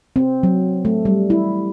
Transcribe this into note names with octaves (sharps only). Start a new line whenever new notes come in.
C4
F#3
A3
G3
E4